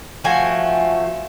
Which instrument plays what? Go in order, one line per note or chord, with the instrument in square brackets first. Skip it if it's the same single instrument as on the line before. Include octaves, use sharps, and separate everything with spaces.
[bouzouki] F3 A3 F#4 G#5